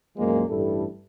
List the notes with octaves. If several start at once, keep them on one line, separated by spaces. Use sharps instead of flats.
C2 F#2 A#2 F3 G#3 A#3
A1 G2 G3 E4 A4